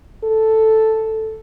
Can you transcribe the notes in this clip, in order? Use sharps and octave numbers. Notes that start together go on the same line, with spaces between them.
A4